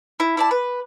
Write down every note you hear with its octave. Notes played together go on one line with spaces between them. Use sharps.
E4
E4 D5 A5
B4